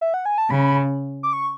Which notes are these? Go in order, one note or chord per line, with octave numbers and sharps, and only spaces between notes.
E5
F#5
G#5
A5
C#3 B5
D6
C#6